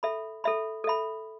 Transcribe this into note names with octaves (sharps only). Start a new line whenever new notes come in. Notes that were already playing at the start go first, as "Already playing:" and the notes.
A4 E5 B5
A4 E5 B5
A4 E5 B5